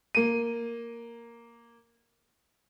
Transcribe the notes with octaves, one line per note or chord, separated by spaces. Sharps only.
A#3 D#7